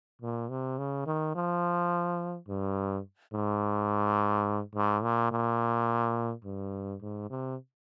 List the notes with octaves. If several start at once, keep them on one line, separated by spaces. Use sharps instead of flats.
A#2
C3
C#3
D#3
F3
G2
G#2
G#2
A#2
A#2
G2
G#2
C3